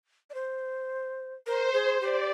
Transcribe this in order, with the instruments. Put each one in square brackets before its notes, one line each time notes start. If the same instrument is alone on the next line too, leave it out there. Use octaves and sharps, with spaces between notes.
[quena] D5
C5
[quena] A#4 [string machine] C5
[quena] G#4
[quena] G4 [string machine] D5